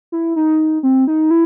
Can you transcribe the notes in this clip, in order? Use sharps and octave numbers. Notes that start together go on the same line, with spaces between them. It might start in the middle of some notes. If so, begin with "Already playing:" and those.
E4
D#4
C4
D#4
E4